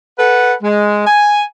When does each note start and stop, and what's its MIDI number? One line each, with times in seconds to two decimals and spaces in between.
0.18 0.54 69
0.18 0.54 71
0.18 0.54 78
0.62 1.04 56
1.06 1.43 80